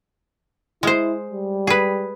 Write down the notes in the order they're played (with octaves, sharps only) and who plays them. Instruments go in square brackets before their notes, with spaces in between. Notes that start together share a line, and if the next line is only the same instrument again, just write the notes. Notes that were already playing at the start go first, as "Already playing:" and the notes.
[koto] G#3 C5 [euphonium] E4
[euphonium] G3
[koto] G#4 B4